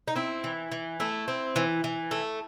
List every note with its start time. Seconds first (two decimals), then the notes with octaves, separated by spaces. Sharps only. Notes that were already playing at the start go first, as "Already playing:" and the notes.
0.08 D#4
0.16 C4 E4
0.44 E3
0.72 E3
1.00 A3 E4
1.28 C4
1.56 E3
1.84 E3
2.11 A3